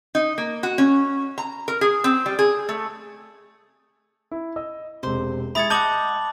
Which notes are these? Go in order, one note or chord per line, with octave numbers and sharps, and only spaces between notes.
D#4
A#3
F#4
C#4
A#5
A#4
G#4
C4
G3
G#4
A3
E4
D#5 E6
E1 C3 C5
G#3 E4 B5 C#6 D#6 G#6 A6
D#5 F#5 A5 D6 G6 F#7